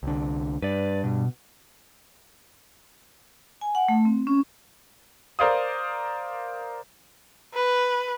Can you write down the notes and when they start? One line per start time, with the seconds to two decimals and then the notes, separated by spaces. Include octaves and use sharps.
0.03 C2 D3
0.62 G2 B4 D5
1.04 B2
3.61 G#5
3.75 F#5
3.88 A3
4.05 C4
4.27 C#4
5.39 A#4 C5 D5 F5 D#6
7.54 B4